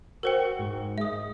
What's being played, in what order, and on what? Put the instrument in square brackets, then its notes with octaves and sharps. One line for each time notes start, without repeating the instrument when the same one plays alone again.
[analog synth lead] F#4 [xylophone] A#4 C5 G5
[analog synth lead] G#2
[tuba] G#3 [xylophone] E5 D#6